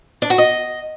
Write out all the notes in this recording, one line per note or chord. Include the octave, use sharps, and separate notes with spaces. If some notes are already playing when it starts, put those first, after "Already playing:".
D4
F#4
D#5